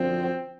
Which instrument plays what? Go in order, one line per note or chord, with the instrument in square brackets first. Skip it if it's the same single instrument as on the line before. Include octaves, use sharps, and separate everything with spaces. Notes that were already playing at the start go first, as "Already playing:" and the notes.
Already playing: [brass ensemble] F#2 D3 F3 [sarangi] C4